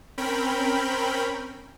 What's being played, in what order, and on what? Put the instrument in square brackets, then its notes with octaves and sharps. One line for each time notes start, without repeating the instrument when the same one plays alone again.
[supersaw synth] C4 C#4 A#4 G5 B5